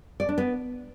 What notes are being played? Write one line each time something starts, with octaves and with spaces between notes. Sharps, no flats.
D5
D4
B3